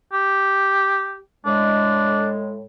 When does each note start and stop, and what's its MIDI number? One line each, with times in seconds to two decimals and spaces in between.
0.13 1.19 67
1.46 2.65 45
1.46 2.65 56
1.46 2.29 62